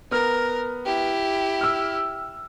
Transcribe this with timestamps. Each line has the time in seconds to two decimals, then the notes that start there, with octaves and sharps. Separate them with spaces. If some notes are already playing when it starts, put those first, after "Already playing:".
0.11 B3 A#4 F6
0.85 E4 G4
1.61 E6 F6